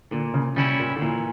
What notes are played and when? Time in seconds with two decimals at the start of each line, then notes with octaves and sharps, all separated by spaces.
0.11 A#2 D3
0.34 C#3
0.56 C#3 G3 C#4 E4
0.79 A#2
0.96 D3
1.01 A#2 E3